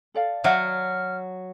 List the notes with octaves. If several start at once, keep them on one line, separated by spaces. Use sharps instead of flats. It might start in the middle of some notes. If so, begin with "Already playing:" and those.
A4 D5 F5
F#3 D#5 E5 F#5 F6